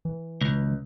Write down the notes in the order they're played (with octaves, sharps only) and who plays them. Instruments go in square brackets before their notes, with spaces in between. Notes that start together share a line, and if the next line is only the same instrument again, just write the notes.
[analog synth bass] E3
[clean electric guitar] C#2